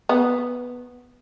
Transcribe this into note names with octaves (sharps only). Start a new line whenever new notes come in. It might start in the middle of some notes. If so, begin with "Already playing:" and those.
B3